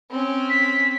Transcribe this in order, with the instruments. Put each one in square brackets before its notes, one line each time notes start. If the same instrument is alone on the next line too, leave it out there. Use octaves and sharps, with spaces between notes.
[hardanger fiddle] C4 C#4
[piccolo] B6